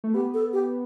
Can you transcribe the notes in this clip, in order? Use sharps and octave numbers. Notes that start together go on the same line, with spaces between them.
A3
B3 G4
A4
G4